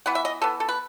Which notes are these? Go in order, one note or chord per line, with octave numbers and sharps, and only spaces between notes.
E3 B3 F#5
E5
D#5
E3 B3 A4
A4
B4